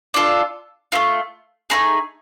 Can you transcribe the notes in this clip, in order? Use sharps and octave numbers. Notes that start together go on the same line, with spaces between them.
D4 F4 A4
A3 C4 F4
A3 C4 D#4 G#4